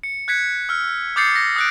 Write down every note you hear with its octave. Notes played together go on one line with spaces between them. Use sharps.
C#7
F#6 G#6 B6 C#7
E6 F6
D6 D#6 G6 A6 C7 C#7
A#6
D#6 F#6 D7